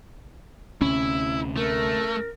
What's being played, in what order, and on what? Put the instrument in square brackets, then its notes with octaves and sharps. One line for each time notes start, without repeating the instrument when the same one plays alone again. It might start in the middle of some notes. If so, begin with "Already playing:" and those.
[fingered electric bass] D2 C3 [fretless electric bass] C#4 [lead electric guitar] E4
[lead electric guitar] A3 [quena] A#4